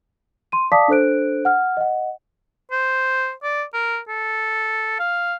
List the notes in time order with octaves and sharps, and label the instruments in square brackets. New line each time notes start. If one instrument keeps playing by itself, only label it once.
[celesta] C6 D#7
D5 F5 A5 D6 D#6 B6
D4 A4 C5 F#6 D7
F#5 F6
D#5 F#5
[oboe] C5
D5
A#4
A4
F5